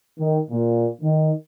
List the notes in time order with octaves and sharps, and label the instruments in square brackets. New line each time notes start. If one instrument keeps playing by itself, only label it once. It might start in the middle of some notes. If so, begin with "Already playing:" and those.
[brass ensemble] D#3
A#2
D#3